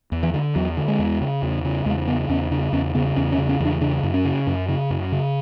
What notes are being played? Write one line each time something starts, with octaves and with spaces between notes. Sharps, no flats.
E2
E3
D3
E2 F#3
D3
G#3
E2
C#3
E2
C#3
E2 G#3
C#3 B3
E2 C#4
C#3 D4
E2 C#4
C#3 B3
E2 C#4
C#4
C#3
C#4
E2
D4
C#3 D4
F#2
C#4
C#3
F#2
C#3
F#2
C#3